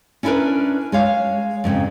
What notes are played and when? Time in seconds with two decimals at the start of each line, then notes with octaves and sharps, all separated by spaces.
0.23 C#4 D4 E4 G4 A#4 B4
0.92 G#3 C#5 F5
1.64 F2 G#2 C#3 C4